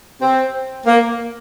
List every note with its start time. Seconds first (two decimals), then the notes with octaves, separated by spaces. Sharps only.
0.21 C4
0.86 A#3